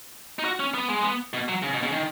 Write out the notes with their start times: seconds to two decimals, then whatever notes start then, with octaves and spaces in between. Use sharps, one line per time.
0.39 D#4
0.45 F#4
0.60 C#4
0.74 B3
0.88 G#3
1.02 B3
1.33 B2
1.48 F#3
1.63 C#3
1.73 B2
1.83 C#3
1.92 D#3